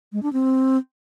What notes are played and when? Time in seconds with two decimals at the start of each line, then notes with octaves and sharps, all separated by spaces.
0.13 G#3
0.23 D4
0.33 C4